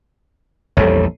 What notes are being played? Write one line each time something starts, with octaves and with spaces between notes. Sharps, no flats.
A#1 E2 G3 A4 C#5